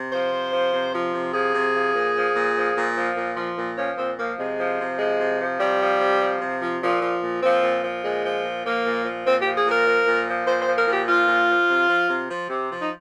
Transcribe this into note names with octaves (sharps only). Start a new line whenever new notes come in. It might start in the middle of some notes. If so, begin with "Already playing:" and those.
Already playing: C3
F3 C5
C3
F3
C3
F3
C3
F3 G#4
C3
F3
A#2
F3
A#2
F3
A#2
F3
A#2
F3
A#2
F3 C#4
A#2 C4
F3 A#3
C3 G#3
F3
C3
F3 G#3
C3
F3
C3 G3
F3
C3
F3
C3
F3
A#2 F3
F3
A#2
F3 C4
A#2
F3
A#2 G#3
F3
A#2
F3 A#3
A#2
F3
A#2 C4
F3 G4
G#4
A#2
A#4
F3
A#2
F3
A#2 C5
C5
F3
A#4
A#2
G4
F3 F4
A#2
F3
C3
F3
C3
F3
C3
F3
D#4